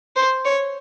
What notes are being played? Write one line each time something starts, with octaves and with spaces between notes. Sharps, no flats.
C5
C#5